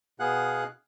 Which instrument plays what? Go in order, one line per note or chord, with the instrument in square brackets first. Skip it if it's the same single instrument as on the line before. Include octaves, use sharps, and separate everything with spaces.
[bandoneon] B2 B3 G#4 F5 F#5 F#6